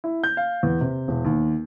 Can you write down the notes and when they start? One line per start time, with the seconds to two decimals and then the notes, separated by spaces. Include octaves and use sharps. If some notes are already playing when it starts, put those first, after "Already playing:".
0.04 E4
0.24 G6
0.37 F5
0.63 E2
0.81 C3
1.08 E1
1.25 D#2